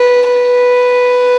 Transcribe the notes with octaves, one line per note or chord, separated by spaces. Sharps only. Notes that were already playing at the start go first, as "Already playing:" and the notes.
Already playing: B4
B4